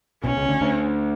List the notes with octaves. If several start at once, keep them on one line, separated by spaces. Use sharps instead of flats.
B1 B2 C#4
C#2 C#3
D2 D3
D2 D3